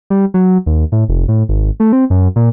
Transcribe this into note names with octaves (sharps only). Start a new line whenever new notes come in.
G3
F#3
D#2
A2
F1
A2
G#1
A3
C4
F#2
A#2